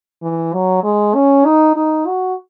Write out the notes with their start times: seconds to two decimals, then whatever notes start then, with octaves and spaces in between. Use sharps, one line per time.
0.22 E3
0.53 F#3
0.84 G#3
1.15 C#4
1.45 D#4
1.76 D#4
2.07 F#4